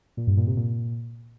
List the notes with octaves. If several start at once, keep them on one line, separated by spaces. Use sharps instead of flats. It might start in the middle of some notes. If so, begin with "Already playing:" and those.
A#2
G2
A#2
C3
A#2